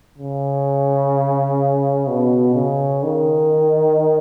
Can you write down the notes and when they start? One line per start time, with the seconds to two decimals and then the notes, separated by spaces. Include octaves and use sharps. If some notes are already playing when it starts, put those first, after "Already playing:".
0.18 C#3
2.08 B2
2.55 C#3
3.03 D#3